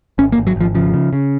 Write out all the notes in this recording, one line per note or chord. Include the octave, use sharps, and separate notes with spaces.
G#1 C#4
A#3
G#1
F#3
G#1 F3
C#3 F3
C#3
C#3